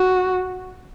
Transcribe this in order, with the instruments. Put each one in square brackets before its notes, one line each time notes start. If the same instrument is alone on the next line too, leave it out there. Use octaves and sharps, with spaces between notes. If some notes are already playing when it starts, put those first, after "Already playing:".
Already playing: [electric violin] F#4